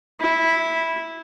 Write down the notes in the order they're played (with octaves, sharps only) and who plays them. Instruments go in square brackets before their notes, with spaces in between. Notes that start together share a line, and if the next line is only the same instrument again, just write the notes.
[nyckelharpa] E4